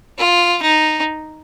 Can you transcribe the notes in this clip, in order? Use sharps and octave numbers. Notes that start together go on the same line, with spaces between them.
F4
D#4